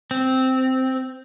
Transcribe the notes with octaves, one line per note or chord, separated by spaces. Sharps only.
C4